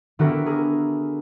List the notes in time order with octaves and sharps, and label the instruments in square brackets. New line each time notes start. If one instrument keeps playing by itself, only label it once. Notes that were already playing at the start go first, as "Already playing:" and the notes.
[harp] D3 B3 E4 F#4 G4 A#4
G#4 A#4